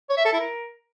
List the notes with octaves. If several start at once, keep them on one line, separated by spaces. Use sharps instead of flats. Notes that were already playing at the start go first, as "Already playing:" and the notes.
C#5
E5
A4
E4
A#4